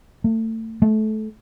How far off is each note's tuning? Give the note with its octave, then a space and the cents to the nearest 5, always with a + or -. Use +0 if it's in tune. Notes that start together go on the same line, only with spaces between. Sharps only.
A3 +30
A3 -25